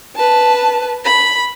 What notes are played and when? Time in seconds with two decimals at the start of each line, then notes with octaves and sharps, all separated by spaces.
0.16 B4 A5
1.05 B5